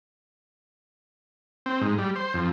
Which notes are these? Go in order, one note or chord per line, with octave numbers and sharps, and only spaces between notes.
C4
G#2
G3
C5
F2